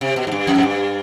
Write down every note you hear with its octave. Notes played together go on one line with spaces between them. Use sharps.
C3
B2
G#2
G2
F2
G#2
G2